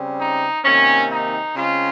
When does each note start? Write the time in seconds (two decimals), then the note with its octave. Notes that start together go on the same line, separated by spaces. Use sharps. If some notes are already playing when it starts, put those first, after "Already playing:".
Already playing: C#3 G3 C4
0.20 D#4
0.64 C3 D#3 A#3 C#4
1.11 D#4
1.56 C#3 G#3 C4 F4